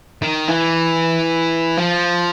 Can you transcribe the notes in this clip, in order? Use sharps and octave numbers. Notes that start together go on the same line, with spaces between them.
D#3
E3
F3